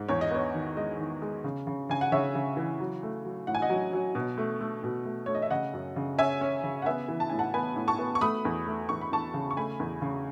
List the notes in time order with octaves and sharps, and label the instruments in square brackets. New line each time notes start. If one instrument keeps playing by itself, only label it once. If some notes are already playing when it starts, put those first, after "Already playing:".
Already playing: [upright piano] G#2
E2 C#5
D#5
B3 C#5
D#3
G#3 D#5
D#3
G#3
C#3
C#3
C#3 G#5
F#5
C#3 C#5 E5
C#3
E3
F#3
A3
F#3
A2 F#5
G#5
D#5 F#5
F#3
F#3
B2
A3
A3
B2
A3
A3 C#5
D#5
E5
C#3 D#5 F#5
F#2
C#3
C#4 E5 G#5
C#4
C#3
F#5
B3 E5 G#5
E3
A5
A2 G#5
F#5 A5
B3 G#5 B5
A2
A5 C#6
B3
C#6
A3 B5 D#6
E2
A3
E2 C#6
B5
E2 A5 C#6
C#3
C#6
A3 G#5 B5
E2
C#3